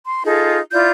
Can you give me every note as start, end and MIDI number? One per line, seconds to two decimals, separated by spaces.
0.05 0.23 84
0.24 0.59 63
0.24 0.59 65
0.24 0.59 68
0.24 0.59 69
0.71 0.91 64
0.71 0.91 65
0.71 0.91 74
0.71 0.91 91